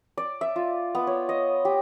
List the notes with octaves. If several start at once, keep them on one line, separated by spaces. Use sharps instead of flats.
D5
E5
F4
B3
C#5
D#5
G4